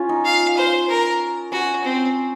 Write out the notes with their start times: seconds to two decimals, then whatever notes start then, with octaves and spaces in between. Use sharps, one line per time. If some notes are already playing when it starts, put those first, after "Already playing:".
Already playing: C#4 F4
0.09 D#4
0.25 F5
0.57 C5
0.89 A#4
1.52 C#4 F#4
1.84 C4